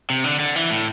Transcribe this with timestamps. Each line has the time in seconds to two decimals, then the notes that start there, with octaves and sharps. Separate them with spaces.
0.10 C3
0.24 D3
0.39 D3
0.56 E3
0.70 A2